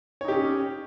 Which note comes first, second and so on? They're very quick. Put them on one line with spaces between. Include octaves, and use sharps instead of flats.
C#5 D#4 G4 C#4